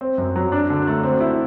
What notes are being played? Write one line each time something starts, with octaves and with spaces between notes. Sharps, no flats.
C4
F#2
F#3
D4
D3
A3
C4
E4